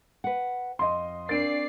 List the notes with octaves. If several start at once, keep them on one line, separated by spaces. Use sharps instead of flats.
B4 F#5
F2 D#5 C6
C4 D4 A#4 D5 A6 C7 D7